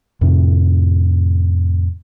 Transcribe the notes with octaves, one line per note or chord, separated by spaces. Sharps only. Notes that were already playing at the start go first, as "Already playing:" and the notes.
F2 A2 C3